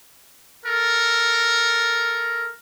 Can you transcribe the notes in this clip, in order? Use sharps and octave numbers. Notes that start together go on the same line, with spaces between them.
A4 A#4